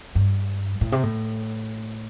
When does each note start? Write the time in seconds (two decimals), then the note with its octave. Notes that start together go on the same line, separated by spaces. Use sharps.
0.15 G2
0.81 A2
0.92 C3
1.03 A2